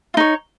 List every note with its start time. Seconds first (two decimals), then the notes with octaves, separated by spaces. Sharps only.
0.14 F4
0.17 D#4
0.20 C#5